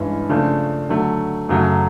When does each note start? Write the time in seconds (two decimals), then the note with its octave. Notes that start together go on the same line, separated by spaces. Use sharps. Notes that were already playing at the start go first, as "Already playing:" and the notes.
Already playing: G2 E3 G#3 C#4 E4
0.29 C#3 F3 A3 D4
0.89 D3 F#3 A3
1.49 F#2 C#3 F#3 A3